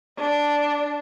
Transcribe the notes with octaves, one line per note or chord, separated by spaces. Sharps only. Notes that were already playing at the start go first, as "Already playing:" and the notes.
D4